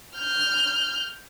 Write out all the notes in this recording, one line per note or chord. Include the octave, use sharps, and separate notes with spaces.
F6 G6